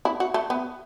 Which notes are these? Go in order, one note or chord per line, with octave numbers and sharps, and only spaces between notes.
E4
F#4
A3
B3